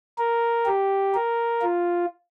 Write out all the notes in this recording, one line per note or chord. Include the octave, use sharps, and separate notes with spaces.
A#4
G4
A#4
F4